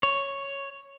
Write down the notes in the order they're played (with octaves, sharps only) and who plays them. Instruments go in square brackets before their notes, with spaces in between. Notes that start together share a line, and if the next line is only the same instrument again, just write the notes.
[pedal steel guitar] C#5